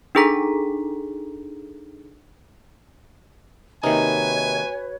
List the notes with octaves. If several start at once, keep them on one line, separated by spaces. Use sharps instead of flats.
D4 D#4 G#4 A4 A#5 B6
C3 D#3 A#3 D#4 F#4 B4 C#5 G#5